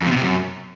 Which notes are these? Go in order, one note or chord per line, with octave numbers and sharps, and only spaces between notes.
F2
C3
B2
C3
F#2